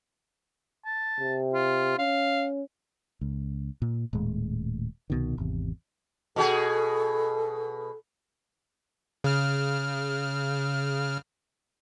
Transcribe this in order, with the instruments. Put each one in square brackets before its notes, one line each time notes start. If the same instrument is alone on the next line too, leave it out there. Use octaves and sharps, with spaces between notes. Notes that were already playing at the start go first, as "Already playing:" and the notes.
[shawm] A5
[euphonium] C3
[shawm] F4
[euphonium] C#4 [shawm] F5
[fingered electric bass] C#2
A#2
D#1 A2 G#3
C2 B2 D#3
G#1 E2 C3
[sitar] B2 F#4 G#4 [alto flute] A4
[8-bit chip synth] C#3 F6